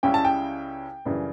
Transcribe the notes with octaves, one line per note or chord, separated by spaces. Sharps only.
C#2 C#3 G3 C#4 E4 G5
A5
G5
F#2 C#3 E3 G3 D4